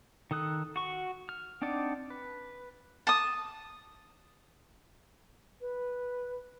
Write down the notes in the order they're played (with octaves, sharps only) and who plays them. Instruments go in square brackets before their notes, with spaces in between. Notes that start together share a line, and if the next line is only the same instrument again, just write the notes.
[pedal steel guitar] D#3 A4 D#6 F#6
F#4 C#6
F6
C4 D4 D#4 D5 F#5
B4
[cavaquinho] A5 D#6
[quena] B4